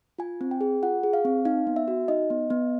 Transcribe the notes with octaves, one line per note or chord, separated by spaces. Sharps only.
F4 G#5
C4
G5
G#4
F4 F#5
G#4
F5
C4
D#4 F5
B3
E5
F#4
D#4 D#5
B3
B3